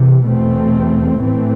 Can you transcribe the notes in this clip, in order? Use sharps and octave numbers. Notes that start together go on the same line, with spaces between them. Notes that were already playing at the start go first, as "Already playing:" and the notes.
Already playing: C3 E3
E2 B2 A3 C4
A2 E3 A3 C4